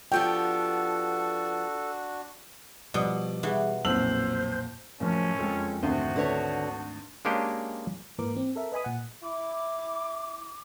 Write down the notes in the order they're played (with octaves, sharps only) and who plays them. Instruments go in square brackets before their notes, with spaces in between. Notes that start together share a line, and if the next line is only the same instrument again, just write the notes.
[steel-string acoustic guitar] F3 B3 G4 [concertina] D4 F#4 [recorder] A4 [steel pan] G5
[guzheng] B2 [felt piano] F3 G3 [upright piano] D5 D#6
[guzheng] E3 F#4 [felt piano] G3 G#4
[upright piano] B1 E6 F#7 [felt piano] F2 A#2 [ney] C5
[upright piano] F#1 [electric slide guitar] A2 F3 F#3 [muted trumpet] C#4
[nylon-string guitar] F2 [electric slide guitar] G#3 F4 A4
[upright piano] G#1 D2 [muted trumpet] F#4 [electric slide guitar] C5 E5
[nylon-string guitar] D3 B4 C#5
[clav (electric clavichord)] G#3 A#3 C#4 D4 G4
[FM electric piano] G#2 E3 A#3 A#4 B4 D6
C4
A4 A#4 E5
B4 D#5 G#5 B5 D#6
A#2 F#5
[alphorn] E4 [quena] D6